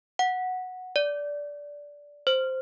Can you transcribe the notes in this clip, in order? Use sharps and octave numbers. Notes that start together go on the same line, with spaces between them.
F#5
D5
C5